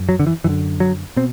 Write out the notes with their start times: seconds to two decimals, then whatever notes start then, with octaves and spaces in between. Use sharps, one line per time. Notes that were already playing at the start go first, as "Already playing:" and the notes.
Already playing: F#2
0.09 F#3
0.20 D3
0.27 E3
0.44 F#2 D3 E3
0.80 F#3
1.16 B2 C4